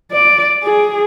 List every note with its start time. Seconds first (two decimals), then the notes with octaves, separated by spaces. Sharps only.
0.11 D5
0.64 G#4